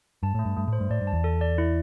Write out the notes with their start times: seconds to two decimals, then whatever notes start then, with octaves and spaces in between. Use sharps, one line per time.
0.23 G2 A5
0.35 A2 A3
0.45 G2
0.57 G2 A3
0.68 A2
0.73 C5
0.80 G2
0.90 A2 D5
1.01 G2
1.07 A5
1.13 E2
1.24 A4
1.41 D5
1.58 E4